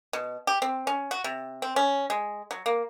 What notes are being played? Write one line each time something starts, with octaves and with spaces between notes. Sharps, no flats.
B2
G4
C4
C#4
F#4
C3
C4
C#4
G#3
F#3
A#3